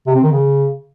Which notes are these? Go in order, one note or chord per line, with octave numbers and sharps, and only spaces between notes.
C3
C4
D#3
C#3